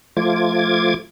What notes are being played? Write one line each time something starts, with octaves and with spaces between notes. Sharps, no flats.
F3 A3 F4 D6 G#6